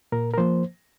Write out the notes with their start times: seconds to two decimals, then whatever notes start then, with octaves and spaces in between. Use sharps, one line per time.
0.12 A#2 A#4
0.34 A#4
0.38 F3 A#3 C5